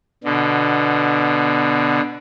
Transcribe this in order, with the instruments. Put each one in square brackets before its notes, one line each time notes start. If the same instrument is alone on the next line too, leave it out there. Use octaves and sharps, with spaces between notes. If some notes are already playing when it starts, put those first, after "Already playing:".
[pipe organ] B2 D3